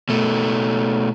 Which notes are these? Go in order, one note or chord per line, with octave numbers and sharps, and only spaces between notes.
B2 A3